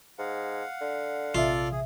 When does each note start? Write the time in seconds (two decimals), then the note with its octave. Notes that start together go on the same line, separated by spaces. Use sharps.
0.18 G#2 F5 F#5
0.81 D3
1.35 A#1 C3 F4 A4 D5 E5
1.72 G#4